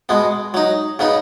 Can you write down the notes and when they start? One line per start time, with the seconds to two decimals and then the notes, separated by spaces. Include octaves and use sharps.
0.09 B2 G#3 B3
0.54 F#3 D#4
0.99 C#3 B3 D#4